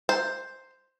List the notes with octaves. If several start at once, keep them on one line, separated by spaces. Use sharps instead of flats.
C5